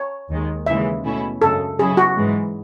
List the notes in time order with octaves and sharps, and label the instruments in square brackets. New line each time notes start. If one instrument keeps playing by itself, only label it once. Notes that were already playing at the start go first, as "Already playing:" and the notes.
Already playing: [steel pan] C#5
[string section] D#2 D#3 G#3
[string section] D#2 C#3 E3 G#3 [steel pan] E5
[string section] B2 A3 C#4 E4
[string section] F#2 C#3 G#3 [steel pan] A4
[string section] C#3 F#3 C#4 E4 [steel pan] G#4
[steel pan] F#4
[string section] G#2 E3 G#3